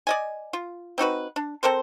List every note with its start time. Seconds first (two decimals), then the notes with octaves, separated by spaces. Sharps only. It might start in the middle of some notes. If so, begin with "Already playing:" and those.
0.07 D5 D#5 G#5
0.53 F4
0.98 C4 D#4 F#4 B4
1.36 D4
1.63 C4 A4 A#4 C5